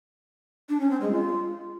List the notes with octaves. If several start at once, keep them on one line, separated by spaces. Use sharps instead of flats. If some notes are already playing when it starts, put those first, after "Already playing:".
D4
C#4
C4
G#3
F4